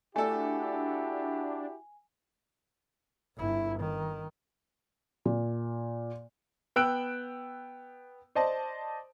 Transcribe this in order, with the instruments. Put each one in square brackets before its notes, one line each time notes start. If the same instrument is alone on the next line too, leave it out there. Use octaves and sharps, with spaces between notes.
[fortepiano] A3 A4 [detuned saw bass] D4 [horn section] E4 F#4 G4 [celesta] G#5
[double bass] G1 E4
D#3
[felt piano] A#2
[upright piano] B3 G5 E6 F#6 D7
C5 D5 D#5 A5